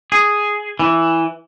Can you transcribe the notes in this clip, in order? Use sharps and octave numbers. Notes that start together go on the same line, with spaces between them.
G#4
E3